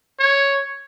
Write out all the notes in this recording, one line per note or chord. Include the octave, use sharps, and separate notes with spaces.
C#5